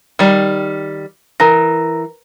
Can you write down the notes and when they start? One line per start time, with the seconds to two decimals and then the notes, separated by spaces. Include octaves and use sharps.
0.19 D#3 G3
1.40 E3 A#4 A#5 A#6